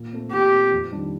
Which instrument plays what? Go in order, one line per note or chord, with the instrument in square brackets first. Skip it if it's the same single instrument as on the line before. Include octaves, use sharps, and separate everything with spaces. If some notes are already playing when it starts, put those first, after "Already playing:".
Already playing: [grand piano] A#2
A3 C4
[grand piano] A#2 [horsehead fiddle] G4
[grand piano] A3 C4
F2
D#3 G3 D4